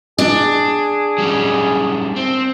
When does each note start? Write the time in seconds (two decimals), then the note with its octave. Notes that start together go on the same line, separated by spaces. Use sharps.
0.18 D4 G#4
1.18 F#3 G3 C#4
2.16 C4